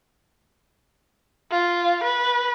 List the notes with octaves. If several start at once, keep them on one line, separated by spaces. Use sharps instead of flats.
F4
B4